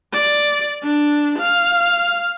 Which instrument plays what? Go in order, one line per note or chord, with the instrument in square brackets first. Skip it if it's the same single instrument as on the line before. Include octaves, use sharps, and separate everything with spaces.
[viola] D5
D4
F5